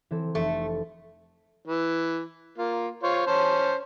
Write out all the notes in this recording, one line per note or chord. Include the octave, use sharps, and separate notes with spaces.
E3 C4 A4
F1 A3
E3
A#3 F4
F4 C5 C#5
C#4 C5 A5